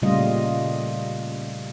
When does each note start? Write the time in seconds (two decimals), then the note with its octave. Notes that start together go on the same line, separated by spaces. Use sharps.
0.02 A#2 C#3 G3 A3 F4 D#5